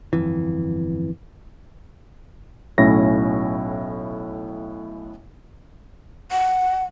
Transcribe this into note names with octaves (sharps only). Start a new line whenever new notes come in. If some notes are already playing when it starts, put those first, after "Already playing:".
G1 F2 E3
B1 A2 C#4 E4 A#6
F#5